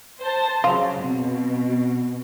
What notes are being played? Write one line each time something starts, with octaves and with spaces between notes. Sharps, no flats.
C5 A5
C#3 F#3 F4
B2 C4